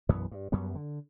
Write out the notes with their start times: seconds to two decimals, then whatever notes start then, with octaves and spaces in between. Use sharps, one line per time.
0.09 B1 F#2 E3 B3
0.31 G2
0.52 F#2 F#3 G3 B3
0.75 D3